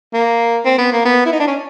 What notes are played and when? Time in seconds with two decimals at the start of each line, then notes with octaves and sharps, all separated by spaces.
0.13 A#3
0.65 C4
0.78 B3
0.92 A#3
1.05 B3
1.25 E4
1.32 D#4
1.40 D4
1.47 C#4